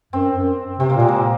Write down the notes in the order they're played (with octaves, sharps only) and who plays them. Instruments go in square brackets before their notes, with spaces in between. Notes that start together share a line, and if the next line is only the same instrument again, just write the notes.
[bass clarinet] F#2 [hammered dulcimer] C4
[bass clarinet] F#2
[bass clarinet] C3 [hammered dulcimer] C4
[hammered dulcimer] A#3
[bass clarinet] A#2 [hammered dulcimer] G#3
[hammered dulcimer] A#3